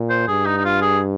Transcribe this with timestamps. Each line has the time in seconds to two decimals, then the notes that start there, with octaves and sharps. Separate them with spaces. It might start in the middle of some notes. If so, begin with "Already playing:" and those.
Already playing: A#2
0.10 C5
0.28 G2 G#4
0.46 D#4
0.57 D#4
0.64 F4
0.82 G#4